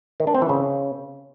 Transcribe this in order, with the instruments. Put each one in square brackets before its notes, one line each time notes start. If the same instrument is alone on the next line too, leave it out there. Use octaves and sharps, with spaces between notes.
[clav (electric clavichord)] D#3
D4
C4
E3
C#3